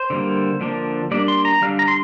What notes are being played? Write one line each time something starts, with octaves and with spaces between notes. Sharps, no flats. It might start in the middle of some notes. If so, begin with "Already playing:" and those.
Already playing: C5
D3 G3 A#3
D3 F3 A#3 D4
G3 A#3 D4 D5
C6
A#5
D3 G3 D4 F5
A#5
C6